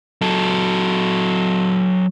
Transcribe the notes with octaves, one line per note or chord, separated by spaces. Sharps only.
F#3 A4